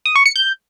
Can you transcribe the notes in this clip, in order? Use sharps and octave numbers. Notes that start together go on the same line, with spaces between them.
D#6
C#6
C#7
G6